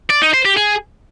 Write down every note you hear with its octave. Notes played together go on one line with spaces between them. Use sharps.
D5
D#4
C5
G4
G#4